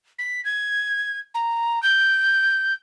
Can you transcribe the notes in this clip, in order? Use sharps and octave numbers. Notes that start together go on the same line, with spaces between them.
B6
G#6
A#5
G6